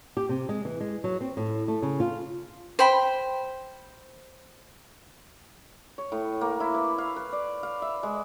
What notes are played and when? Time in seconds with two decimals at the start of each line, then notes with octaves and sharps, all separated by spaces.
0.17 G4
0.29 C3
0.49 G#3
0.65 E3
0.81 G#3
1.04 F#3
1.21 C4
1.37 A2
1.68 A3
1.82 C#3
2.00 F4
2.79 C5 G5 B5
5.98 C#5
6.12 A2
6.41 A#3
6.60 E4
6.75 B4
6.98 F5
7.16 B4
7.32 D5
7.63 F5
7.82 E5
8.03 G#3